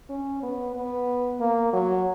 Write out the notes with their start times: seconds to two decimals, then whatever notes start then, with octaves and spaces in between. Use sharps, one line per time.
0.09 C#4
0.42 B3
0.76 B3
1.40 A#3
1.73 F#3